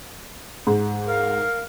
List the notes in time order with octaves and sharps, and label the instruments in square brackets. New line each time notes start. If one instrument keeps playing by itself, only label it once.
[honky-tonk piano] G#2
[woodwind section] A#4 F5